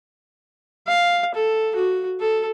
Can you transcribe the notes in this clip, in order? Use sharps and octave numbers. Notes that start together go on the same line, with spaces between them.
F5
A4
F#4
A4